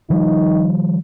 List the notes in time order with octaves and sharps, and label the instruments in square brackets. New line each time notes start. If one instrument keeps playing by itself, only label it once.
[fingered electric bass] D#3 F3 G3 [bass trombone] D#4